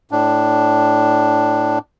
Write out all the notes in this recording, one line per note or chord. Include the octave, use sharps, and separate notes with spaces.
A2 D4